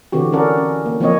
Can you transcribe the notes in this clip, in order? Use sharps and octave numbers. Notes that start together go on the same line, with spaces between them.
D3 E3 C4 F#4 G4
C#4 A4 A#4 D5 F#5
C#4
A#3
F3 A#3 C4 C#5 D#5